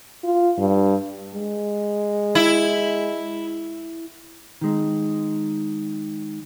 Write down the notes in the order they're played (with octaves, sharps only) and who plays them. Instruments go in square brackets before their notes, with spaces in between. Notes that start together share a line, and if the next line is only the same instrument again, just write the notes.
[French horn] F4
G2
[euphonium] G#3
[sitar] E4
[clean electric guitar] D#3 G#3